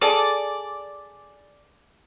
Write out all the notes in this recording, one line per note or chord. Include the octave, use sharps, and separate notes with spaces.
G#4 A4 D5 G#5